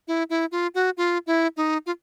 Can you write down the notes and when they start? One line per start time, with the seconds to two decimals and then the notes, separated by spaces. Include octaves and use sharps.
0.08 E4
0.30 E4
0.52 F4
0.75 F#4
0.97 F4
1.27 E4
1.57 D#4
1.86 F4